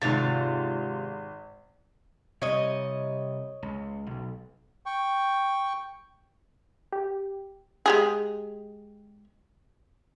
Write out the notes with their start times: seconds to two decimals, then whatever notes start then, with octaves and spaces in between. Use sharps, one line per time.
0.02 G#1 C3 F4 F#4 A6
2.42 C3 G3 C#5 D#5
3.63 C#2
4.07 B1
4.86 G5 C#6
6.92 G4
7.86 G#3 G4 G#4